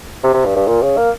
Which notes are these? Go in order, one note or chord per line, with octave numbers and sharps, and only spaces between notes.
C3
C3
G2
G2
A#2
C#3
A#3